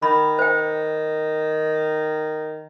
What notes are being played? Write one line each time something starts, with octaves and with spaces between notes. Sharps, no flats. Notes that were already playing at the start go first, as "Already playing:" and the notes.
D#3 B5
C5 G5